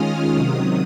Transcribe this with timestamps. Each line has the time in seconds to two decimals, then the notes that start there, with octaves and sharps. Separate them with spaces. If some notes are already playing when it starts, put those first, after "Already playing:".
Already playing: D#3 G#3 C#4 F4 D#6 F6
0.35 C3 D#3 F#3 D#6